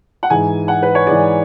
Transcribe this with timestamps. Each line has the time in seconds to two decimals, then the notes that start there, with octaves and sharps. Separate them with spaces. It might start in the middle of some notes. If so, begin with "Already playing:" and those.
0.23 F#5
0.30 G#2 E3 G#5
0.68 F#5
0.82 B4
0.95 C#5
1.07 G#2 E3 D5